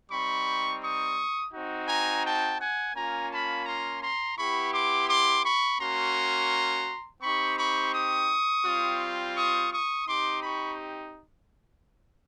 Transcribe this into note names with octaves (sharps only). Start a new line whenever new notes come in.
G3 C4 D#4 B5 C#6
C#6 D#6
C4 D#4 F#4
G#5 A#5
G5 A5
F#5 G#5
A#3 C#4 F4 G#5 A#5
A5 B5
A#5 C6
A#5 C6
B3 E4 G4 B5 C#6
C6 D6
C6 D6
B5 C#6
A#3 C#4 F#4 A#5 C6
C4 D#4 G4 B5 C#6
B5 C#6
C#6 D#6
G3 C4 F4
C#6 D#6
C#6 D#6
C4 D#4 G4 C6 D6
B5 C#6